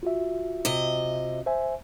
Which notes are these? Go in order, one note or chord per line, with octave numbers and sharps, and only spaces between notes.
F4 F#4 E5
C3 D#5
C5 E5 G#5